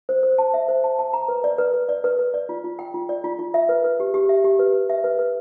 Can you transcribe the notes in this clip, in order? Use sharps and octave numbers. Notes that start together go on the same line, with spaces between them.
C5
C5
A5
E5
C5
A5
A5
A#5
B4
D5
B4
B4
D5
B4
B4
D5
F4
F4
G5
F4
D5
F4
F4
E5
B4
B4
G4
G4
E5
G4
B4
B4
E5
B4
B4